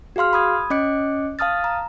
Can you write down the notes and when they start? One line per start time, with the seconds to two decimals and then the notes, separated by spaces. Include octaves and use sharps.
0.16 F#4 G#4 F5 C6 F6
0.33 B5 D#6 G#6
0.70 C#4 D#5 D6 F#6 C#7
1.39 F5 A5 D#6 F6 A6
1.64 A#5